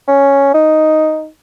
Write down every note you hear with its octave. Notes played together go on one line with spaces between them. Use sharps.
C#4
D#4